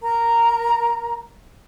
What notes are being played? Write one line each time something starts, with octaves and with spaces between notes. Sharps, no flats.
A#4 A#5